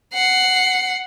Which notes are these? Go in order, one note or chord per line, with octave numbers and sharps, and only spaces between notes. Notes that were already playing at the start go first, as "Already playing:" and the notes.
F#5 C7